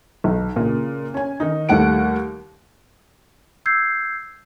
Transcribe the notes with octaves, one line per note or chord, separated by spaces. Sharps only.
B1
A#2 C#3
C#4 G#5
D#3 D#4
D#2 G3 A3 F#5 D7
E6 G6 G#6 C7